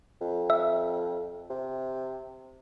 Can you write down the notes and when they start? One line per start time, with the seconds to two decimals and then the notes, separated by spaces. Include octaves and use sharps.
0.21 F2
0.50 E5
1.50 C3